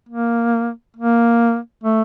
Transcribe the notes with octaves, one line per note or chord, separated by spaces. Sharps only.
A#3
A#3
A3